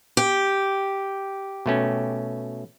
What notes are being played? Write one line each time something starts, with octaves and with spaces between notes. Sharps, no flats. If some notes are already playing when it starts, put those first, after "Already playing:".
G4
B2 A3 C#4